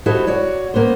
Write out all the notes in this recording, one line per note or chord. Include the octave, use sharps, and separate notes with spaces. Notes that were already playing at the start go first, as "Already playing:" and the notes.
E4 F#4 G4 A4 C5 D#5
F#4 C#5 D5
A#3 B3 C#4 C5